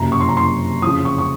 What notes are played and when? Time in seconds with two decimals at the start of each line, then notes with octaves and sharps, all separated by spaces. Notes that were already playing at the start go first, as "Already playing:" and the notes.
Already playing: F#1 F2 C3 F#3 A#5
0.12 C#6
0.20 C6
0.29 A#5
0.37 C6
0.82 F2 C#3 F3 D#6
1.05 C#6
1.18 C#6